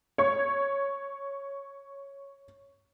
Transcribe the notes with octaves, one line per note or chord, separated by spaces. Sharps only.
C#5 C#6 G#6